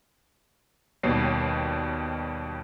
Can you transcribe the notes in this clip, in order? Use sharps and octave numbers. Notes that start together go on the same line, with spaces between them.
D#2 B2 G3 C#5 C7